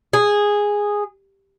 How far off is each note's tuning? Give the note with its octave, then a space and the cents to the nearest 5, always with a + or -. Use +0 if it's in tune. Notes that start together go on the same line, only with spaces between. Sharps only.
G#4 -10